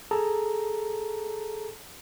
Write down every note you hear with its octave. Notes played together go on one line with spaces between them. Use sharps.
G#4 A4 A5 A#5